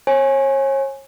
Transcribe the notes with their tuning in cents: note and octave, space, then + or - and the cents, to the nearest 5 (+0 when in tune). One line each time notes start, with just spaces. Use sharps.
C#5 -35 G#5 +0